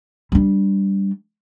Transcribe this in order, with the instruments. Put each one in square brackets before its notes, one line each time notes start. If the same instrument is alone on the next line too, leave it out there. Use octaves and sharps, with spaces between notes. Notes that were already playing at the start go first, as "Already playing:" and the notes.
[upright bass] G3 D4